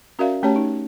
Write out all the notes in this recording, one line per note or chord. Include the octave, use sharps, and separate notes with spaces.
C#4 F#4 A#4 D5 E5 F5
A3 C#4 G4 C#5 A5
D#4